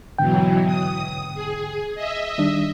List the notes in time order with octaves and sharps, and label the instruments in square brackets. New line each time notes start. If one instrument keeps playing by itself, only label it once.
[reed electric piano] G#2 D3 G5 [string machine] B2 E3 F#3
[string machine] D#6
G#4
D#5 E5
[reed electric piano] D#3 G3 D4